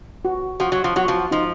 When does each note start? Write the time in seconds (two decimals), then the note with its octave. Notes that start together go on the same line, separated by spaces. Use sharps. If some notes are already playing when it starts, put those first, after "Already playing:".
0.25 F#4
0.60 F3 F#4
0.72 F#3
0.84 F3
0.96 F#3 F#4
1.08 F3
1.31 F3 D#4